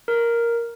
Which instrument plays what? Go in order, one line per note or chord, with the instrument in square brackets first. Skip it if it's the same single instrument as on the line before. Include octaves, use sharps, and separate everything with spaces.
[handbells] A#4